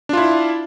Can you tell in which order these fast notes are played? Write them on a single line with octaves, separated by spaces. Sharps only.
D4 F4 E4